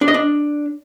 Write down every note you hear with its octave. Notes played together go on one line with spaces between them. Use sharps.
D4
D#5
D4